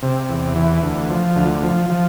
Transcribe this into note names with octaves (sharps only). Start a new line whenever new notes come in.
C3
E2
E3
D2
F3
D2
F3
F3